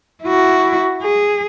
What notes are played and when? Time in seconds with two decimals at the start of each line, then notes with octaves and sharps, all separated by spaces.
0.24 E4 F#4
1.03 G#4